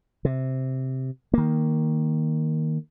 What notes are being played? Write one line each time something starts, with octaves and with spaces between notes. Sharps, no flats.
C3
D#3 A#3